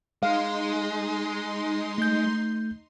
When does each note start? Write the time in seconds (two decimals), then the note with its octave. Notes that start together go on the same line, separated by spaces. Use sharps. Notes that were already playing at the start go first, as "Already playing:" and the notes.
0.23 G#3 D#4 F5 C6
1.98 A3 G6